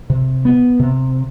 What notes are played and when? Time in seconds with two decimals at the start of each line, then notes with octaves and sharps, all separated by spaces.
0.10 C3
0.45 B3
0.80 C3